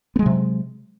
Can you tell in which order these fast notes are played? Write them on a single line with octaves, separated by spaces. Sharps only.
B3 G#3 F#3 C3